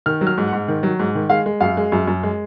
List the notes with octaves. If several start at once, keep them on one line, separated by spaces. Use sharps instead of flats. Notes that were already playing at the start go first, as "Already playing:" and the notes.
D#3 F6
F#3
F6
G#2
F#5
G#2
D#3
F#3
G#2
D#3
G#3 F5
G#3
F#2 F5
G#3
F#2
F#2
G#3